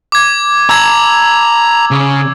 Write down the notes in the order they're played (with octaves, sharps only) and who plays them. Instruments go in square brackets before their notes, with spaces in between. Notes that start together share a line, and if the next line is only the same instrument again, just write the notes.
[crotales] D6 G#6
[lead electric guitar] A5 A#5 [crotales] E6 G#6
[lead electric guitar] C#3